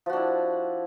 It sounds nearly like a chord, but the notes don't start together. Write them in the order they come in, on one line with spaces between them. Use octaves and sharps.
F3 F#4 D4 E4